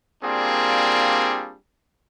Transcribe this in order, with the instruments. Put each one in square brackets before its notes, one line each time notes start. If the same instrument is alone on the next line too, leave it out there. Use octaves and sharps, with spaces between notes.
[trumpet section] G3 A#3 C4 D4 F4 G#4